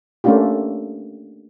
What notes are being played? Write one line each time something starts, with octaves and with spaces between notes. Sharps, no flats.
A3 A#3 C#4 D4 F4 G4